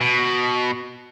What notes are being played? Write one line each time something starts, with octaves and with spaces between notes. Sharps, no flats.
B2